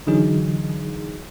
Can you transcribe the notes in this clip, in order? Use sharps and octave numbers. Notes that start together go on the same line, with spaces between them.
D3 E3 F#3 D#4 G#4